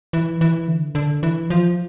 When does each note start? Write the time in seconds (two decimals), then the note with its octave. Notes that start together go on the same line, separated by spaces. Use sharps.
0.13 E3
0.41 E3
0.68 D3
0.95 D3
1.23 E3
1.50 F3